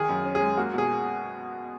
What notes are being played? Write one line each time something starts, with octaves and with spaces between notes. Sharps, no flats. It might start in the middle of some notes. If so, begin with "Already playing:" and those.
Already playing: D#3 G#4
F#2
C#4
G#4
G#3
A#3 F#4
B2 G#4